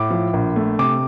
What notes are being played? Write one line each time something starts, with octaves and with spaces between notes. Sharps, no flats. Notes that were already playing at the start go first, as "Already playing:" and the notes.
Already playing: A2 D6
F3
A#1
A3
C3 D6